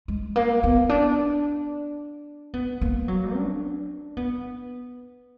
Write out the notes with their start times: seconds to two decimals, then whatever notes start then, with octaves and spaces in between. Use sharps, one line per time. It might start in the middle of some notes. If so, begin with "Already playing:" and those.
0.08 G#3
0.36 A#3
0.63 B3
0.89 D4
2.54 B3
2.81 A#3
3.08 F#3
3.35 D4
4.17 B3